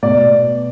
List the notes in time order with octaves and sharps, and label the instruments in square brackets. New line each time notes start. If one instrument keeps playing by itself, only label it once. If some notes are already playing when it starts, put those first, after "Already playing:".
[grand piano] B2 D5